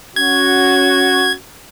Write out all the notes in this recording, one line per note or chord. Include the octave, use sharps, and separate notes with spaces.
C#4 F#4 G#6